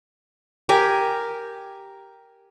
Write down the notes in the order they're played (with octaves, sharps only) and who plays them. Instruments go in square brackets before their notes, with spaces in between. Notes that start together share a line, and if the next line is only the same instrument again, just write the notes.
[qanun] G4 A#4 G#5